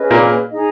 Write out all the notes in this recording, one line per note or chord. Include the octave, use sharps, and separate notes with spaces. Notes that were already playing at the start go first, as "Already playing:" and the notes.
Already playing: C#4 G#4 B4 D#5
A#2 A#3
D#4 G#4 D#5